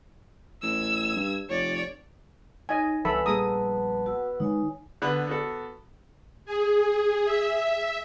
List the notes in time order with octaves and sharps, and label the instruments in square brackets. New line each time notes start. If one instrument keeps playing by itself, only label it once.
[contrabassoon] A1 [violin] E6 G#6
[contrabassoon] G2
[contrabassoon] F1 [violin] C#5 D5
[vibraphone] D#4 C#5 [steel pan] D#5 G#5
[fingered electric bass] C2 E3 [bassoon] B3 [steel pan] A4 E5 B5 [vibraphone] C#5 G#5
[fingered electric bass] A#1 G3 A#3 [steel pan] G#4 A#5 D#6 [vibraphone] A5
[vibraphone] F#4 F#5 E6
[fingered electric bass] D#3 G#3 [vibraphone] D#4 C#5 G#5
[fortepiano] D3 B3 B4
B3 F#4 A4
[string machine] G#4
E5